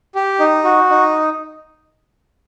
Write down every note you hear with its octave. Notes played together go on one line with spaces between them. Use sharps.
G4
D#4
F#4
D#4